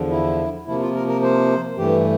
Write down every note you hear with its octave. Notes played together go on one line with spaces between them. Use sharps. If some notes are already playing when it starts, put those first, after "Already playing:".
Already playing: E2 D3 F3
E4
C3 F3 A#3 E4
F4
A#4
A#4
C5
G2 E3 A3 G4